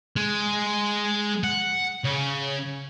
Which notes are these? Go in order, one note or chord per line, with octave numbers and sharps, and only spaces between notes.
G#3
F#5
C#3